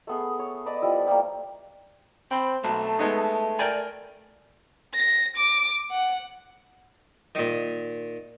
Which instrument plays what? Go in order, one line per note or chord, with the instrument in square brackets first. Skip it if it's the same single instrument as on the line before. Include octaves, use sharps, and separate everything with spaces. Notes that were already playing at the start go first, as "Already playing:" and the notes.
[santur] A3 B3 G#4
C#5
B4 D5 D#5 A5
F3 G3 E4
G3 A3 A#3
[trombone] C4 [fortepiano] G5 [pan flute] B5
[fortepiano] B1 [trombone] A3 [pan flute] A5
[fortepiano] G#3 B3 D#4
[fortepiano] A#4 G5 G#5 [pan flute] D5
[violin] A#6
D6
F#5
[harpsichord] A#2 D#3